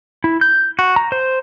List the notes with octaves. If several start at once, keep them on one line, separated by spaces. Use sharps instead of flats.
E4
G6
F#4
A#5
C5